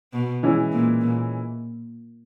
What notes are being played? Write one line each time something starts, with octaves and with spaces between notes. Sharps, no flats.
B2
E3 G#3 C#4 E4
A#2
A#2